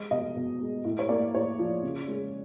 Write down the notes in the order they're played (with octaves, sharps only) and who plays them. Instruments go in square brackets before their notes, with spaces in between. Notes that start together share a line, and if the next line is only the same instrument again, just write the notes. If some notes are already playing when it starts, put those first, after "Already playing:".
Already playing: [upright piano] G#3 D#5
B2 D#5
B2
G#3
A2
C#5
A#3 D5
A2 C#5
F3
C#3
G#3